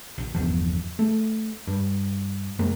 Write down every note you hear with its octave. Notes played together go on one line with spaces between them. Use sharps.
A#1
G1 E2 F3
A3
G2
F1 F#2 G#3 A#3